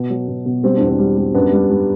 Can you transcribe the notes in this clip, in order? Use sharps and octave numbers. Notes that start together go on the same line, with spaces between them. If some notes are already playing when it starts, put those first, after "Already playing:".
Already playing: B2 B3
F#3
B2
B2
G3 C4
D4
E2
C4
G3
G3
F#2 B3 D4
G3
G3